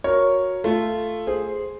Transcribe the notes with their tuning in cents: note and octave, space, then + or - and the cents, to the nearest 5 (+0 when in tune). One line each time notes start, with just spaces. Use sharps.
F#4 -10 A#4 +0 C#5 +0
A3 +0 F4 -10
G#4 +0 C5 +0